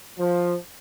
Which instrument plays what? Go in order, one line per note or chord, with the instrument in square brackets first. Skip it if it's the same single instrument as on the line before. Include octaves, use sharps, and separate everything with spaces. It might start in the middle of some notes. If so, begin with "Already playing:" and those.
[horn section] F3